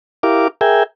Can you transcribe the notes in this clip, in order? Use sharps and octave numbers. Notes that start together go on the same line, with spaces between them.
E4 G4 A#4 F5 D6
G#4 A#4 E5 G5 G#5